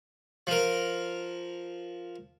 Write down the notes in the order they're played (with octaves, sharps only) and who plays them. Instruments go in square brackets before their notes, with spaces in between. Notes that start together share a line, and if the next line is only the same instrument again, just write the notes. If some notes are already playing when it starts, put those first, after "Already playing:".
[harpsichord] F3 A#4